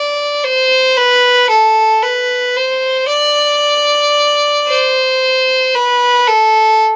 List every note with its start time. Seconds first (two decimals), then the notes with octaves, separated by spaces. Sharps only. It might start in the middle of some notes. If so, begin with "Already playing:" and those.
Already playing: D5
0.44 C5
0.97 B4
1.50 A4
2.03 B4
2.57 C5
3.09 D5
4.68 C5
5.75 B4
6.28 A4